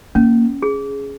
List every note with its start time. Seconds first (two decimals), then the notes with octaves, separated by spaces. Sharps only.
0.15 A#3 C#4
0.62 G#4